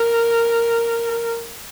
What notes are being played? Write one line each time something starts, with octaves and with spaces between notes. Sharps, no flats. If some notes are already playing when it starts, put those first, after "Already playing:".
Already playing: A#4